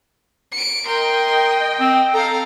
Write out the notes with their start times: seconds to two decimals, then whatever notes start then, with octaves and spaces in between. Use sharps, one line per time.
0.52 C#7 D7
0.87 A#4 D#5 G5 C6
1.80 C4
2.14 A4 F5 A#5